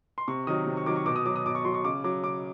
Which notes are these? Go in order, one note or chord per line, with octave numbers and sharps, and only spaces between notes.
C6
C3 C#6
D#3 F#3 D#6
C3
C#6
D#3 F#3 D6
C#6
B2 D6
D#6
F#3 D6
D#6
B2 D6
C#6
F#3 C6
C#6
C#3 D6
F#3 D6
C#3 D6